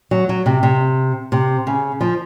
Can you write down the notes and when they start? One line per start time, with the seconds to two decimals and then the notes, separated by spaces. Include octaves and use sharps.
0.11 F#3
0.29 F#3
0.46 C3
0.63 C3
1.32 C3
1.67 C#3
2.01 F3